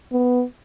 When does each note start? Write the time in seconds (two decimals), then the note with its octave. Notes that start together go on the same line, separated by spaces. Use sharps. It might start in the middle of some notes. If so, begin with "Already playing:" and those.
0.12 B3